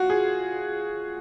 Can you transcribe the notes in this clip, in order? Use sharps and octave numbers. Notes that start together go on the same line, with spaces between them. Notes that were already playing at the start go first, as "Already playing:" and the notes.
Already playing: F4 F#4
G#4